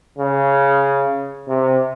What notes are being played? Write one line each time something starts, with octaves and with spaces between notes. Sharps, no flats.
C#3
C3